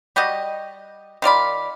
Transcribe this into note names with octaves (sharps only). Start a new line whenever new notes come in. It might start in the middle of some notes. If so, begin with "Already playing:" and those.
G3 F#4 G4 D#5
D#3 F4 D5 B5